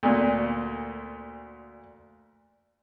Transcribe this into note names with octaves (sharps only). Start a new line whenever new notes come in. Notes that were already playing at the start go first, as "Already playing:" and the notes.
D2 A#2